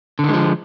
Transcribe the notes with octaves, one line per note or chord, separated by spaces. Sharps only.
D3 D#3 F3 G#3